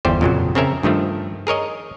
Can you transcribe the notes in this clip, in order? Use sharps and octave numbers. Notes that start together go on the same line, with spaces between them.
G1 E2 G3 G4 C5
F2 A#2 C#3 F#3
C#3 C4 C#4 A#4 E5
G2 D#3 F3 A3
G#4 A#4 C#5 D#5